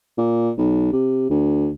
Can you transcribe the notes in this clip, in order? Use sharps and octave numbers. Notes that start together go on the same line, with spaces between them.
A#2
B1
C3
D2